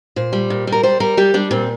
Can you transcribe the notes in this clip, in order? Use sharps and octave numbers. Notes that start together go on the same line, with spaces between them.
A#2 C5
G3
A#2
G3
A#4
G3 C5
G3 A#4
G3 G4
G3 D4
A#2 C4